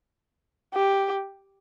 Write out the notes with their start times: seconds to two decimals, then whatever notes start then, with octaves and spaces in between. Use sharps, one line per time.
0.74 G4